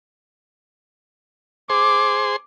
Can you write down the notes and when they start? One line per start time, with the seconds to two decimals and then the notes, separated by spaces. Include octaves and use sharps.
1.70 G#4 C5 C6 D6